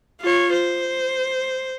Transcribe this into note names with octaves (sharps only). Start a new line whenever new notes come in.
F4 C#5
C5